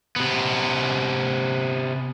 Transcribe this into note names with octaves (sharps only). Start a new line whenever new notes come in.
C3 B3